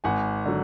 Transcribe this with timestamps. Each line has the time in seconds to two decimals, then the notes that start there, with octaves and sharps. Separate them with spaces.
0.04 G#1 F#5 G#5
0.46 D3 F#3